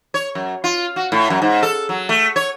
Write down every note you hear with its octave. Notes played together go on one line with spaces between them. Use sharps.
C#5
F#2
F4
F#4
A2
F#2
G#2
A4
F#3
A3
C#5